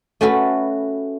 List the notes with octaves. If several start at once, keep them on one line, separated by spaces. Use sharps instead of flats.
A3 C#4 F#4 B4